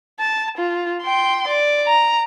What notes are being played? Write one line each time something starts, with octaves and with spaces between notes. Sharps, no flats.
A5
F4
G5 C6
D5
A#5